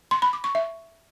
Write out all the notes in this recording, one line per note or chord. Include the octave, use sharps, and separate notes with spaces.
C6
B5
D6
C#6
E5